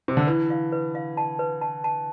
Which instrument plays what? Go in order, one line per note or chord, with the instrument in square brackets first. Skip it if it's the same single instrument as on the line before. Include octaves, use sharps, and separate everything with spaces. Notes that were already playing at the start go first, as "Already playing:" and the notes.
[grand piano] C3
D3
[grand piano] E3 [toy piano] B4
[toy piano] F5
B4
F5
A5
B4
A5
A5